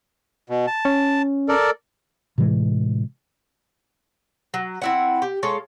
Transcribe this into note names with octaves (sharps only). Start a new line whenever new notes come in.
B2
A5
C#4
A4 A#4 D5
A2 C3 E3 G#3
F#3
C4 E4 F#5
G4
G#3 F4 A4 C#5